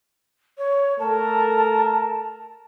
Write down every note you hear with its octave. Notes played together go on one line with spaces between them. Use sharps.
C#5
A3 A4 A#4 A5